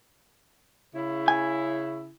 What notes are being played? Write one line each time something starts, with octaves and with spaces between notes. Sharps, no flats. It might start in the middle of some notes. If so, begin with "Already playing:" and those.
C#3 E4
G#5